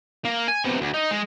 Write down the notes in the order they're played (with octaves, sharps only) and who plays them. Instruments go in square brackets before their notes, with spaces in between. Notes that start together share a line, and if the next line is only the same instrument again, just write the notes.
[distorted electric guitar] A#3
G#5
C3 B3
D2
D#4
G#3